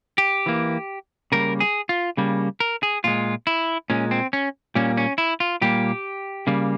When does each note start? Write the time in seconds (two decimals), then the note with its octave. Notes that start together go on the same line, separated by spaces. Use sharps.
0.18 G4
0.46 E3 A#3
1.32 C#3 G3 A#3 A#4
1.60 G#4
1.89 F4
2.17 C#3 G3 A#3
2.60 A#4
2.83 G#4
3.04 A#2 G#3 F4
3.47 E4
3.90 A#2 G#3 C#4
4.11 C4
4.33 C#4
4.75 A#2 G3 A#3 C#4
4.97 C#4
5.18 E4
5.40 F4
5.62 A#2 G3 A#3 G4
6.47 C#3 G3 A#3